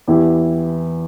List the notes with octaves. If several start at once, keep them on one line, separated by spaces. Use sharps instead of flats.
E2 E3 B3 E4 G4